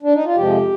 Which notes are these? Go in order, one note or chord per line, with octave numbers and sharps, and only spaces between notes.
D4
D#4
F4
F2 C3 F3 G#3 G4